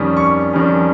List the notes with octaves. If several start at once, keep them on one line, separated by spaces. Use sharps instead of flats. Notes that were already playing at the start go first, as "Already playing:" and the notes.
Already playing: F2 D#3 G3 C#4 D#6
C#6
F2 D#3 G3 C#4